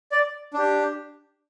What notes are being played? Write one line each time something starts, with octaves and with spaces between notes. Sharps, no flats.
D5
D4 G4